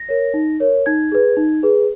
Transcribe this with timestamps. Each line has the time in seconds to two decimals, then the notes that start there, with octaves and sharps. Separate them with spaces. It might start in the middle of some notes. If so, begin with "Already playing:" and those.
Already playing: A#6
0.09 A#4 C#5
0.34 D#4
0.60 A#4 C#5
0.86 D#4 G#6
1.12 G#4 B4
1.37 D#4
1.63 G#4 B4